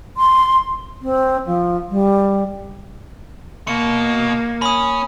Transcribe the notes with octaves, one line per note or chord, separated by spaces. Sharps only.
C6
C4
F3
G3
B2 A#3 C#7
C#4 B5 D#6